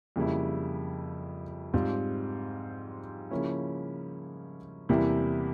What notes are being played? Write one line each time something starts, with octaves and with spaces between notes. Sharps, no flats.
F2 C#3 G3 A#3 E4
G#2 G3 C4 F4
C#3 F3 A#3 C#4 E4
E2 C3 G3 A#3 E4